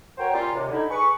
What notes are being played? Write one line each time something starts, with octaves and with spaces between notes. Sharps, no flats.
F#4 A#4 C5 C#5 G5
G3 A#3 C4 C#4 F4
D#2 C3
D3 D#4 E4
G#4 B4 C#6